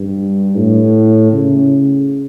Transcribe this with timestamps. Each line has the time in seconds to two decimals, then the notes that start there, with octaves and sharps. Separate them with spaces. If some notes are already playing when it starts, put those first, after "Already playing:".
Already playing: G2
0.56 A2
1.33 C#3